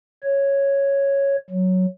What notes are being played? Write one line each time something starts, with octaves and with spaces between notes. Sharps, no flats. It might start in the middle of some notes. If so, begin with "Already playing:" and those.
C#5
F#3